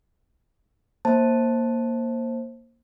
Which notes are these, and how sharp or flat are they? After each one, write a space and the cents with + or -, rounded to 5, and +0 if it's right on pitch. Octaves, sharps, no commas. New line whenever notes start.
A#3 +0 C5 +20 A5 +0